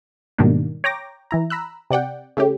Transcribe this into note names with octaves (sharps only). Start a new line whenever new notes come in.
G#2 B2 D#3 G3 A#3 D4
C#5 G5 A#5 D6 A#6
E3 E4 A#5
A#5 B5 E6 F#6
C3 D5 F#5 G5
C#3 A3 C#4 G4